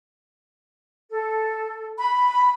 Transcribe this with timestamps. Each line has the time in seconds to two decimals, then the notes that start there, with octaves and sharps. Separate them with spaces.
1.11 A4
1.98 B5